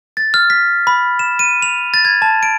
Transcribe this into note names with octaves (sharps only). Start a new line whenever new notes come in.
A6
F6
B6
B5
E7
D#7
F7
A6
G#6
A5
D7